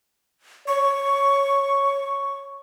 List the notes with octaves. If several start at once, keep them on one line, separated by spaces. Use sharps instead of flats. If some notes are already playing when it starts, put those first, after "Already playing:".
C#5 C#6